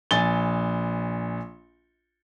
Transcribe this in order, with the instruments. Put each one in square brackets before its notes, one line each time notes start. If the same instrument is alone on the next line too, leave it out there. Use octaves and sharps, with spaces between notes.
[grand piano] A#1 G#5 A6 G7